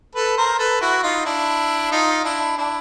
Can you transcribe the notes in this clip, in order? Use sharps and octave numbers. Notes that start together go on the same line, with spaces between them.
A4 B4
A#4 C5
A4 B4
E4 F#4
D#4 F4
D4 E4
D#4 F4
D4 E4
D4 E4